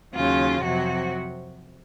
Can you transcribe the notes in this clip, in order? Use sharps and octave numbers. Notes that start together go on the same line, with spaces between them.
D#2 C#3 F#3 F4
F2 C3 F#3 F#4